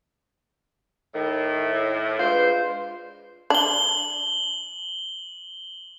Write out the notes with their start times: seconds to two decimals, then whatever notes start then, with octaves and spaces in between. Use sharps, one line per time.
1.15 A2 D#3
2.19 G#3 D4 F4 B4 C5
3.50 D4 F#7 G7